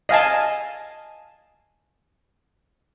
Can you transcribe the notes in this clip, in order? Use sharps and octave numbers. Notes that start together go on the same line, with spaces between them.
D#5 F5 G#5 A5